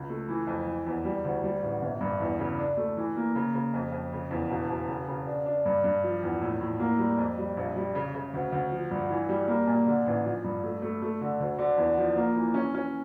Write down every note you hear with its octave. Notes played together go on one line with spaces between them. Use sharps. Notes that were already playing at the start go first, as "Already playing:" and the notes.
Already playing: C#2
A3
E3
F2
E3
E2
G3
D2
G3
A1
G1
G2
E2
C#3
D4
A3
E3
A#3
C#3
C#3
F2
F2
C#3
E2
E1
E1
C#3
C#3
D4
D4
G2
G2
F3
E2
A2
A2
A#3
G3
F2
G3
A#1
G3
C#3
C#3
D2
D2
F3
G2
E3
G3
A#3
A#2
D3
A1
F3
G2
A3
A3
A3
D3
D2
D3
E2
F3
A#3
E3
C#4
C#4